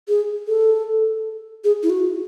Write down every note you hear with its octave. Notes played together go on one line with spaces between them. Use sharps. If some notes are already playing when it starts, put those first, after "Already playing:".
G#4
A4
G#4
E4
F#4